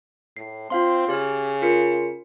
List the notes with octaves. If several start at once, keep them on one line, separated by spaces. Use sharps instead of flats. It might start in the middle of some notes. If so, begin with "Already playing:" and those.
A2 C7
C4 F4 F5 C6
C#3 G4 C#5 F6
F4 A#4 C#7